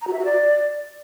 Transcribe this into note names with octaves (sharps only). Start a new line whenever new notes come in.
A#5
F#4
E5
F#4
D5